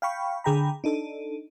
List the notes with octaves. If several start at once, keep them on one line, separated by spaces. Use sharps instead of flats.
F5 G5 B5 C#6
D3 G#4 G5 A#5 B5
D4 D#4 A4